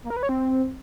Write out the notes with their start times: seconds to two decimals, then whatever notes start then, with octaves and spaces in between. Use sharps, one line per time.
0.04 A#3
0.10 A#4
0.17 B4
0.23 C#5
0.29 C4